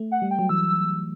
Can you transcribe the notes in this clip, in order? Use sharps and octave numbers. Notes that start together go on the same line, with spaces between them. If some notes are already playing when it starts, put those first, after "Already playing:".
Already playing: A3
F#5
G3
G5
F#3
E3 E6